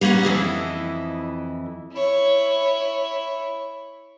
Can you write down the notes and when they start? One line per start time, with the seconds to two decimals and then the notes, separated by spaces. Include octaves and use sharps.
0.01 G3 A#3 C4 C#4 F#5
0.23 F2 E3 E4 D#5
1.92 E4 C#5